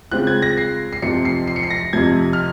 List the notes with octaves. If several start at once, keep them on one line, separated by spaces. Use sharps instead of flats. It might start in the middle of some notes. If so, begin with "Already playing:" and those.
C#3 G#3 C4 F4 F#6
G#6
A#6
C7
C7
F2 C3 F3 C4 C#7
C7
C7
C#7
C7
A#6
F2 C3 F3 G#6
F6